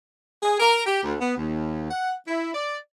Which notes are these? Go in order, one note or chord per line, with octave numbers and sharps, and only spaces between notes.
G#4
A#4
G4
D2
B3
D#2
F#5
E4
D5